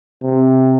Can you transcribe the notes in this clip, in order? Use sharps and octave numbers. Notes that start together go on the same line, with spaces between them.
C3